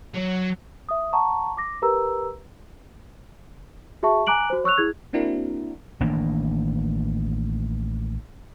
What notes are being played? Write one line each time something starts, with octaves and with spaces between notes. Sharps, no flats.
F#3
E5 D#6
F#5 A5 A#5 C#6
D6 A#6
G4 A#4 B4 A#5 E6
F#4 G#4 E5 A5 C#6
G#5 A#5 D6 F#6 D7 F#7
F#4 C5
C#5 C#6 E6 F#6 F7
E4 G#4 G#6
A#3 C4 D4 E4 F#4 A#4
A1 D#3 A#3 D4